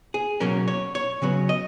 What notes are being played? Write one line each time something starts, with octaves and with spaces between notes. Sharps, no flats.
G#4
B2 F#3 A#3 C#4 A#4
C#5
C#5
C#3 F#3 B3
D#5